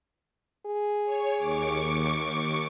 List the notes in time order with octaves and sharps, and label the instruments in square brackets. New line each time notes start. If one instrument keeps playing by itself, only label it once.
[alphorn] G#4
[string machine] C#5
D#2 C#6 D6